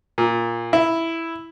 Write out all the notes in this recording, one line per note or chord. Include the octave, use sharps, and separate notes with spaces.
A#2
E4